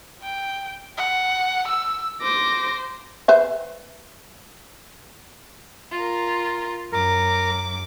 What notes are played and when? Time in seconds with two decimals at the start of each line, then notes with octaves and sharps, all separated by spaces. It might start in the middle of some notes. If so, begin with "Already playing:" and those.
0.23 G5
0.98 F#5
1.67 E6
2.22 C5 D6 A#6
3.28 B4 C5 E5
5.91 F4 A#4
6.92 F#2 A#4 D6